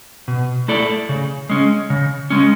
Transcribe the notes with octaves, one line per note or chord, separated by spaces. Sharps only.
B2
A3 E4 A4 D5
C#3
G#3 C#4
C#3
G#3 C#4